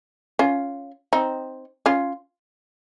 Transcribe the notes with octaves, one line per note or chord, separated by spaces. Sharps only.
C#4 F4
C4 D#4
C#4 F4